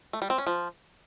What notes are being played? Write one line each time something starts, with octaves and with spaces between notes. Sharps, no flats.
A3
G3
C4
C#4
F3